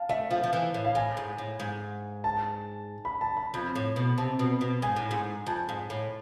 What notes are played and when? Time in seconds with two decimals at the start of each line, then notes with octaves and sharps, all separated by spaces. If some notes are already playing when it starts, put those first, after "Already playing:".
Already playing: F5 A5
0.09 A3 E5
0.31 F3 F5
0.43 F3
0.53 E3
0.74 A2
0.85 F5
0.95 A2 G#5
1.17 G#2
1.38 A2
1.60 G#2
2.24 A5
3.05 B5
3.21 A5
3.37 B5
3.54 F2
3.75 A2
3.96 B2
4.18 C3 A5
4.39 B2
4.61 B2
4.82 G#2 G#5
4.96 A2
5.11 G#2
5.46 F2 A5
5.69 G#2
5.90 A2